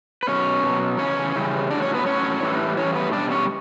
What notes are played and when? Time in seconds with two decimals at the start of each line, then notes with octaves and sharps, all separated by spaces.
0.23 B4
0.28 B2 F#3 C#4 C#5
0.63 B2
0.68 F#3
0.99 C#3 E3 C#4 C#5
1.35 C#3 E3 G3
1.70 A2 F#3 D4 D5
1.82 C#4 C#5
1.94 B3 B4
2.06 A2 F#3 C#4 C#5
2.42 A2 E3 G3
2.77 A2 E3 G3 C#4 C#5
2.95 B3 B4
3.12 B2 G3 D4 D5
3.31 C#4 C#5